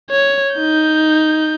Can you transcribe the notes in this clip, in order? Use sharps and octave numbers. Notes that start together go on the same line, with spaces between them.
C#5
D#4 G6